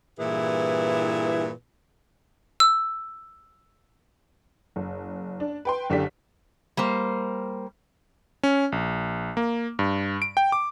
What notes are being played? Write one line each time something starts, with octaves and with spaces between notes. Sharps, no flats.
G2 A#2 E3 E4 G#4 B4
E6
F#1
D4
B4 G5 C6
F#1 D3 G4 D5 B6
G3 A#3 C5
C#4
A#1
A#3
G2
D7
G5
D6